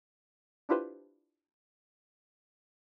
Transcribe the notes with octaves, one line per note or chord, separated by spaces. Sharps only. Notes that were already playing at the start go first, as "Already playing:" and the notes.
D4 E4 F4 G4 B4 C5